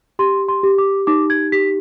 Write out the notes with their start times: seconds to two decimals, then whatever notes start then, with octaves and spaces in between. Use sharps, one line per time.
0.19 G4 C6
0.49 C6
0.63 G4
0.78 D6
1.07 D#4 D6
1.30 G#6
1.52 G4 B6